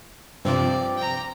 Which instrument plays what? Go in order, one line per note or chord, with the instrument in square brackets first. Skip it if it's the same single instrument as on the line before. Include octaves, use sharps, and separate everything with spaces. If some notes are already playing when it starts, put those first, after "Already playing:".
[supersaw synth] G2 C3 F3 [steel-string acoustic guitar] C4 [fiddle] D5
[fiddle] G5 A#5